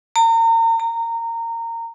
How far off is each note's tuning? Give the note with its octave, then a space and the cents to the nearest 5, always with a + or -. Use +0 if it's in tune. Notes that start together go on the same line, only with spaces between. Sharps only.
A#5 -35
A#5 -20